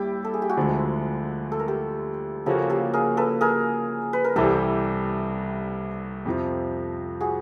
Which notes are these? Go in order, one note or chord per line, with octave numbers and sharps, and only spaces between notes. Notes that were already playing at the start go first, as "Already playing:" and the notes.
Already playing: D#2 G3 E4 G4
A4
G#4
G4
F#4 G#4
D2 D3 F3 G#3
A4
A#4
G4 A4
C#3 F3 A#3 C#4 F#4 G4 A4
G4 A4
G#4 A#4
A4 B4
G#4 A#4
B4
A#4
C2 C3 E3 G3 G4 A4
F2 C3 F3
F#4 G#4